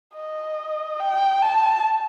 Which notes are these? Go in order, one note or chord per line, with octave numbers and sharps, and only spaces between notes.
D#5
G5
A5